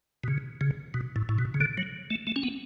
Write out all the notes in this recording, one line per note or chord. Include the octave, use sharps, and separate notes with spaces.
B2
C#3
C#3
B2
A2
A2
B2
C#3
D3
F#3
A3
A3
C#4
B3